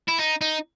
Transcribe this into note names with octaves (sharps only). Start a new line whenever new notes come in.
E4
D#4
D#4